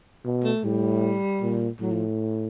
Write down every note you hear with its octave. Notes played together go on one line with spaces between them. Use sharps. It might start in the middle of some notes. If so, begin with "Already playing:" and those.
B2
A3
A2 G3
A#2
A2 F#3
F3